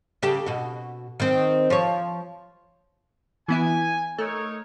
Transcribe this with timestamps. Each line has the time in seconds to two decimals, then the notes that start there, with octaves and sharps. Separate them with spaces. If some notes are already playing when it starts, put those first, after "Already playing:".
0.23 C#3 G4 A4
0.46 B2 F#4
1.20 D#3 C4
1.70 F3 C#5
3.48 E3 B3 E4 G#5
4.18 A3 D#4 A#4 C#5